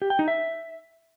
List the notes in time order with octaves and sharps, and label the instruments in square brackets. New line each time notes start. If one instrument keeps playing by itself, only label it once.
[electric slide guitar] G4
G5
D#4
E5